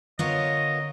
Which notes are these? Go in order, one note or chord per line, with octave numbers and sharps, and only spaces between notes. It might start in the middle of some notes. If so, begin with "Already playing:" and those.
D3 B3 F4 A#4 C#5 D#5